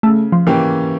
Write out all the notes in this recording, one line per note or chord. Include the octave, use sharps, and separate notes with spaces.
C#3 A3
F3
E3 A#3 C#4 G4